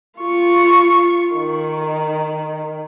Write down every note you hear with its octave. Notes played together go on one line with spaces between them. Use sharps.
F4 C#6
D#3